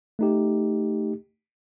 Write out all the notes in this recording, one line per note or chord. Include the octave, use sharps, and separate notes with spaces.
A3 D#4 G4